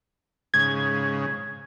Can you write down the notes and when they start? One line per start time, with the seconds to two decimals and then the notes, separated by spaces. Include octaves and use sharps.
0.54 G#2 C#3 G#6